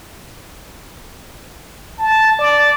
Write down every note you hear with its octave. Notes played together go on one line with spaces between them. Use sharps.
A5
D5